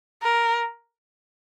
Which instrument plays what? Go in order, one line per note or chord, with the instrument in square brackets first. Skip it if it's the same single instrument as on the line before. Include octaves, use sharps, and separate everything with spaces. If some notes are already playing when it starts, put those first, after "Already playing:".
[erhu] A#4